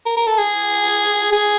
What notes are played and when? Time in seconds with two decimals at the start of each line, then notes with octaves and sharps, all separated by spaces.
0.06 A#4
0.17 A#4
0.27 A4
0.38 G#4
1.32 G#4